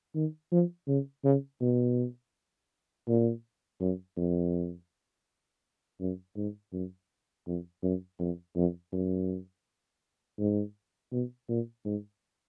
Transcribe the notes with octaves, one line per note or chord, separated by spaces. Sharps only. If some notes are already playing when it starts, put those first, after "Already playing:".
D#3
F3
C#3
C#3
B2
A#2
F#2
F2
F#2
G#2
F#2
F2
F#2
F2
F2
F#2
G#2
B2
A#2
G#2